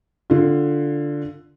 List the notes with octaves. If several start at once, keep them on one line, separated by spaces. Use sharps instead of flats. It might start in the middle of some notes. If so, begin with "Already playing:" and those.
D3 F4